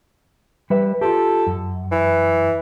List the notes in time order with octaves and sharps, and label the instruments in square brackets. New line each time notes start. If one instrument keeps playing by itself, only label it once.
[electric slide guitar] G3 B4 E5
[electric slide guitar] F4 G4 [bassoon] A4
[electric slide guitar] F#2
[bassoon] E3